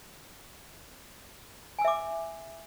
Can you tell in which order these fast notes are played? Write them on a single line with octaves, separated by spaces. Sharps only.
G#5 E6 E5 D6